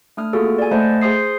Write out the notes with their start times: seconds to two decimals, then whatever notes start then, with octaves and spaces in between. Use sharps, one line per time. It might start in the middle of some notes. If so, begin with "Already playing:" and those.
0.17 A3 D4 D#6 F6
0.33 A#3 B3 F4 F#4 G#4 A4
0.58 D5 G#5
0.71 A3 C5 D#5 F#5 A5
1.01 G#4 C5 C6 D#6 C7